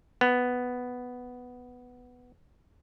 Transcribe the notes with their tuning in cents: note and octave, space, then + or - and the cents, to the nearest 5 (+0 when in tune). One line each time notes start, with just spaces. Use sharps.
B3 +5